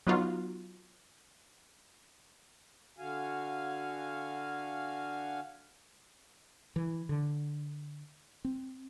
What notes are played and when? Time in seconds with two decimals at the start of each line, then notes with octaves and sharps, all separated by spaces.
0.07 F#3 B3 D#4 F4 F#4
2.98 D3 F#4 F5 G#5
6.76 E3
7.09 D3
8.45 C4